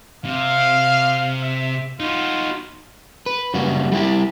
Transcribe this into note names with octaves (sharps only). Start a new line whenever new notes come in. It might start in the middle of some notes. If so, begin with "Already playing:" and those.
C3 F5
E5
D#4 F4 F#4
B4
F#2 C#3 G3 A#3 F#4
G3 A3 E4 G4